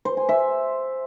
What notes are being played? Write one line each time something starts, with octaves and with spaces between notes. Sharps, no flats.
C5
G#5
E5